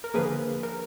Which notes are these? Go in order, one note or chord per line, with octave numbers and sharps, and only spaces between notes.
A#4
D3 F3 A#3 G#4 B4
A#4